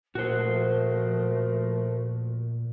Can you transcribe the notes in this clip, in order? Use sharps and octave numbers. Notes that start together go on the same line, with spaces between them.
A#2 F3 A3 F#4 A#4 C5